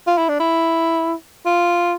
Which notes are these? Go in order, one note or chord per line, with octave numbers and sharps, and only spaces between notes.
F4
E4
D4
E4
F4